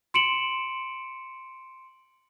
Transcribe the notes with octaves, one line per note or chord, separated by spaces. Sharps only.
C6 C#7 D7 E7 F#7